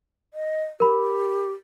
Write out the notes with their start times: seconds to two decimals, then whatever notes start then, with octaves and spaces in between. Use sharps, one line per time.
0.34 D#5
0.80 G4 A#4 B5